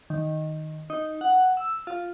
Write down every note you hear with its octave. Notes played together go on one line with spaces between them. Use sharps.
D#3
D#4
F#5
E6
F4